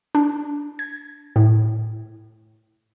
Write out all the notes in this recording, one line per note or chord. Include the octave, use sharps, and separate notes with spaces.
D4
G#6
A2